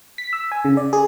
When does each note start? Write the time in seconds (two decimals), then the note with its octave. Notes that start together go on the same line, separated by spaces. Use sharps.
0.18 B6
0.33 E6
0.52 G#5
0.65 C#3
0.77 D5
0.93 G#4